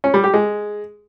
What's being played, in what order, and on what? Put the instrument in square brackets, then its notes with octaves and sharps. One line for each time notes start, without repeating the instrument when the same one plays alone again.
[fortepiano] C#4
G3
G4
G#3